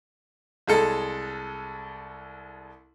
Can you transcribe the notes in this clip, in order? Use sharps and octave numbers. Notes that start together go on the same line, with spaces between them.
C2 G#3 A4